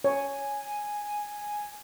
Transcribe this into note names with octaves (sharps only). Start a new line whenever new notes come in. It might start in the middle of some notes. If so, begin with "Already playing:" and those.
C#5 G#5